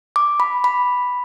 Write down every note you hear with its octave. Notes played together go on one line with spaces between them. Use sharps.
D6
B5
B5